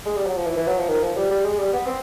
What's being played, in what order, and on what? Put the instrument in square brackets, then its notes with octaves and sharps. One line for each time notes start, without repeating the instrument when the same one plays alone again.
[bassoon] G#3
G3
F#3
F3
E3
E3
F#3
F3
D#3
F3
G3
G3
G#3
G3
B3
C4